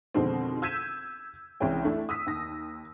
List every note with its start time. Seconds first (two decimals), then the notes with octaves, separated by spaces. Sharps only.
0.14 F2 B2 D3 D#3 G#3 C4
0.62 E6 G6 G#6 B6 D#7 E7
1.60 C2 E3 G#3 C#4 G5
1.85 A3 D4 E4
2.09 D#6 E6 B6
2.27 D#2 A#6